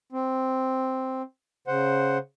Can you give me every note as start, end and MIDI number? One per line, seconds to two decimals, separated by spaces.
0.12 1.22 60
1.68 2.18 49
1.68 2.18 72
1.68 2.18 78